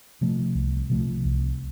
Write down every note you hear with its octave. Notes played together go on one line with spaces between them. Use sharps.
C3 F3 A3
C2
C3 F3 A3
C2